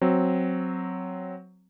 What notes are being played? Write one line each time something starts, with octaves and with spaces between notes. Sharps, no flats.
F#3 C4